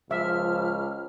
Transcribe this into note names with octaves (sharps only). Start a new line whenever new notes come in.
C#2 F3 E5 F6